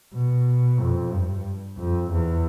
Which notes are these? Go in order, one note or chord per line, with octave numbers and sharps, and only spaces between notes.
B2
F2
G2
F2
E2